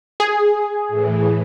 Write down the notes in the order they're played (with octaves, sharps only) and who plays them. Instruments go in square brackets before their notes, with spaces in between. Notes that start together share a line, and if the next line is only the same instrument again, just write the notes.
[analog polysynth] G#4
[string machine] A2 E3